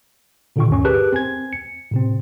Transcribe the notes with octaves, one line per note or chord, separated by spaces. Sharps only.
A#2 D3 D#3 F4 G5 C#6
D2 G2 C#4 C#6
G4 G#4 A#4 B4 A5 F#6
C4 G#5 G#6
C#7
A2 C3 C4